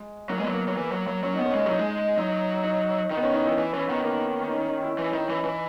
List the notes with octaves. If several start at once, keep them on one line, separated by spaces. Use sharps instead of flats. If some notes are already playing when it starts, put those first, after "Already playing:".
Already playing: G#3
F#3 A#3
G#3
F#3 B3
A#3
F#3
E3
F#3
F#3
F#3 C#4
B3 D#4
C#4
G#3
F#3 D#4
G#3
F#3 D#4
D#4
D#3 D#4
B3
C#4
D#4
E4
E3
E3 C#4
D#3 B3
A#3
C#4
D#4
E4
E3 E4
D#3 D#4
E3 C#4
D#4
E3